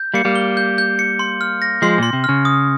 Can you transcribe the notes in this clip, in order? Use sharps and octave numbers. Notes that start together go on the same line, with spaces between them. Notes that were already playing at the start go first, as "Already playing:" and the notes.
Already playing: G6
G3 A#3 C#7
G3 A#3
G7
G6
G6
C#7
C6
F6
A#6
F3 G#3 C6
A#2 C6
C3
C#3 F6
D#6